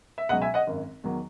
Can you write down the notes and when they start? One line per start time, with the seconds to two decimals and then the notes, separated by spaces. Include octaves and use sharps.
0.18 E5
0.29 C#2 B2 F#3 D#5 F#5
0.42 E5 G#5
0.54 D#5 F#5
0.67 G#1 F#2 D#3
1.04 E2 D#3 F#3